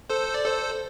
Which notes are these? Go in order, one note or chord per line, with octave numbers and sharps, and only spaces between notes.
A4 C5
D5
A4 C5